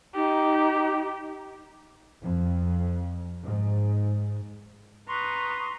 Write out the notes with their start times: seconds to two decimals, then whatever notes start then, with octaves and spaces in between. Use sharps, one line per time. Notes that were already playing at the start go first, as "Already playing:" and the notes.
0.15 D#4 G4
2.22 F2
3.42 G#2
5.09 B4 A#5 C6 C#6 D#6